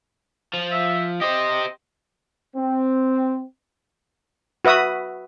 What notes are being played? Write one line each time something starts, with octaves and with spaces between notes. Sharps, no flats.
F3
E5
G4 C5 D#5
C4
F#4 B4 E5 D#6